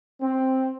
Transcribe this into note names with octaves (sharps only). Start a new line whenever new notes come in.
C4